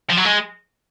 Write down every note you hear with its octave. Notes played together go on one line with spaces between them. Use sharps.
F3
F#3
G#3